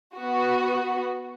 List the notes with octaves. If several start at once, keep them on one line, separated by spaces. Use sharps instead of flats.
B3 F#4